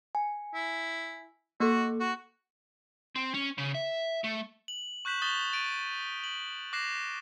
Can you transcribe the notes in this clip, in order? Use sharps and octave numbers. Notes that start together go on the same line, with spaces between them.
G#5
E4
A#3 F#4 A4
F#4
C4
C#4
C#3
E5
A3
F#7
C#6 F#6 G6 B6 E7 F#7
C#6 D#6 G6 A6 B6 G7
A6 D7 D#7
F#7
D6 F#6 A#6 C7 E7